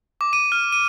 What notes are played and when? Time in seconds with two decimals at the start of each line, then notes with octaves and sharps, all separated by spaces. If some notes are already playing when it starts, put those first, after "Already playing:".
0.21 D6
0.33 D#7
0.52 F6
0.72 D#7